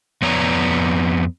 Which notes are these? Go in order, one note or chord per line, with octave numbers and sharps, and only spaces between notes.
F2 B3 C#5 D5 A#5